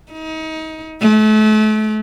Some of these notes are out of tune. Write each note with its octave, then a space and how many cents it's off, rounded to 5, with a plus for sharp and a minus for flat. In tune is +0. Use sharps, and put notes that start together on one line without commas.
D#4 +30
A3 -35